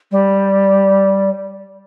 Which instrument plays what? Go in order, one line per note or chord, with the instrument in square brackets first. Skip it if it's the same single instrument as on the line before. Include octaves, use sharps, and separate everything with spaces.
[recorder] G3